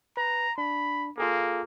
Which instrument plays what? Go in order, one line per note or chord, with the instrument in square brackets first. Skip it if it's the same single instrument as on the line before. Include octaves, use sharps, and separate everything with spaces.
[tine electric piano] B4 [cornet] A#5
[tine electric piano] D4 [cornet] B5
[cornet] A#3 [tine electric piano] F4 G#4 A4